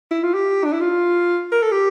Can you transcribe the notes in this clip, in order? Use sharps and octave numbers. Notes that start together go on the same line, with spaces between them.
E4
F4
G4
D4
E4
F4
A#4
A4
G4